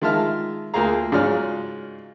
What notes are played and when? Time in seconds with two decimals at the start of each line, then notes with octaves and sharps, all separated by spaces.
0.01 D#3 G#3 F4 E5 A5 F6
0.74 D2 A#3 F4 G#4 F5 A#5
1.12 G#2 C#3 F#3 F4 D5 F6